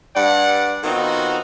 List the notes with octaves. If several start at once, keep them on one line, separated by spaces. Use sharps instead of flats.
G2 D5 F#5
D#3 B3 C4 D#4 F4 F#4